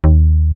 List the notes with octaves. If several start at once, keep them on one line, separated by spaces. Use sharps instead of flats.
D#2